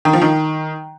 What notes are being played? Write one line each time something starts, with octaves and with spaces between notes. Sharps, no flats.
D#3
F3
D#3